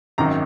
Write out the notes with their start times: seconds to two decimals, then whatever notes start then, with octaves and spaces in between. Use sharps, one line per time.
0.18 G#1 F#2 D#3 A#5